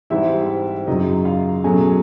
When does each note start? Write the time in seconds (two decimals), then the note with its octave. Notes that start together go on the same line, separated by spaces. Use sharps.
0.10 G#2 E3 G3 C4 E4 E5
0.87 F#2 C#3 F#3 D#4 D#5
1.25 F4 F5
1.64 B2 F#3 A3 C#4 G#4 G#5